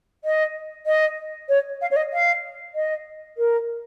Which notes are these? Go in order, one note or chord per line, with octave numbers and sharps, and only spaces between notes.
D#5
D#5
C#5
F5
C#5
D#5
F5
D#5
A#4